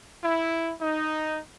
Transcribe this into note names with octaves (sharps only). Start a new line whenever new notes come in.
E4
D#4